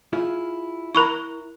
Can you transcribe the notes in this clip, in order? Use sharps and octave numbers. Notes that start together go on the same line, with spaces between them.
E4 F4 G#4
E4 A#4 A#5 B5 C#6